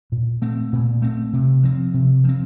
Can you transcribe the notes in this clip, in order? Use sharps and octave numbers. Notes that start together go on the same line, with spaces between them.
A#2
A3 C4
A#2
A3 C4
C3
F3 C4
C3
F3 C4